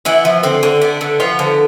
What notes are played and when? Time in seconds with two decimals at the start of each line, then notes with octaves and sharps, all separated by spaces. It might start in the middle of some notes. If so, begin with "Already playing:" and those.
0.05 E3 B3 E4
0.25 F3
0.43 D3 C4
0.63 D3
0.82 B3 D4
1.01 D3
1.20 F3 B3 F4
1.39 D3